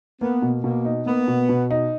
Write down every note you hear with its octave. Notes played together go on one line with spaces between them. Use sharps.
A#3 B3
B2
B2 A#3
D#4
A#3 B3
B2
B2
D#4